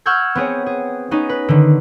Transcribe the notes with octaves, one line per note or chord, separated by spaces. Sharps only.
F#5 C#6 E6 F6 G6 G#6
B3 C4 G#4 C#5
G#4
B3 C#4 D#4
B4
D3 D#3